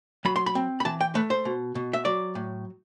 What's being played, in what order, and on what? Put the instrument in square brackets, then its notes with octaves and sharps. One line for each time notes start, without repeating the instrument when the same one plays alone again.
[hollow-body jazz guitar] F#3 B5
C6
B5
C4
B5
E3 A5
G5
A3 B4
C5
B2
B2
E5
F#3 D5
A2